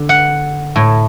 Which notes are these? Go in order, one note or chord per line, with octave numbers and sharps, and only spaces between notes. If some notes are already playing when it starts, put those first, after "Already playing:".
Already playing: D3
F#5
A2